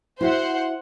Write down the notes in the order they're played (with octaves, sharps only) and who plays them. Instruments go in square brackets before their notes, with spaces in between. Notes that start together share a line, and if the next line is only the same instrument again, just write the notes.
[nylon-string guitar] E4 F#4 E5 [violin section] C5 F#5